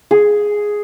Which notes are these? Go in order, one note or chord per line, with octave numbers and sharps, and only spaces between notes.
G#4